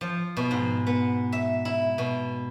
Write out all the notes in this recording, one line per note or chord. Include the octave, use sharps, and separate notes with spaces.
F3
B2
G#2
B3
E5
E4
B2